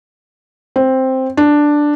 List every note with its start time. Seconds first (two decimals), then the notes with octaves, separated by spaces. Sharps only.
0.76 C4
1.37 D4